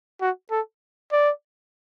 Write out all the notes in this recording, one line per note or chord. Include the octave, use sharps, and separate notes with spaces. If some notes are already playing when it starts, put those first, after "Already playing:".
F#4
A4
D5